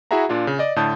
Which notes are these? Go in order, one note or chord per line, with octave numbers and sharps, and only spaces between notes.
E4 F#4 G#4 E5 F#5 A#5
A#2 D4 F4
C#3
D5 D#5
A2 D3 A5 D#6 G6